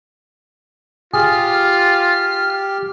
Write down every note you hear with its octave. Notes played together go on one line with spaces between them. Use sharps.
F4 G4 G#4 F6